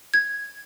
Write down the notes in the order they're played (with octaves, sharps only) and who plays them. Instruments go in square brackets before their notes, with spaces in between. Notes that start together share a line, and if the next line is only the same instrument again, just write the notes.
[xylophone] G#6